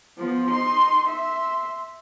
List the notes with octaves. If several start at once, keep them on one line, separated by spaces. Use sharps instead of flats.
F3 B3
D#4 C6
E5 C6